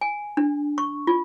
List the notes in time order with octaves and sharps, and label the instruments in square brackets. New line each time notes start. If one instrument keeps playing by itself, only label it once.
[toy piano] G#5
D4
C#6
F4